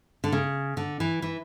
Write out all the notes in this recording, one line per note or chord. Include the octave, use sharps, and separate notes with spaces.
D3
C#3
D3
E3
E3